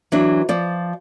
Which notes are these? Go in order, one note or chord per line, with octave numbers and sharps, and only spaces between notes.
E3 F#3 D4
F3 D5